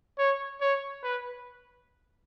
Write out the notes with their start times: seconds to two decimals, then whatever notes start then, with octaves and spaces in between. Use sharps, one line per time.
0.18 C#5
0.61 C#5
1.04 B4